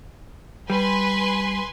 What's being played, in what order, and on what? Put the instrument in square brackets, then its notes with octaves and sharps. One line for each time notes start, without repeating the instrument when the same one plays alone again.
[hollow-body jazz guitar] G3 [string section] B4 G#5 C6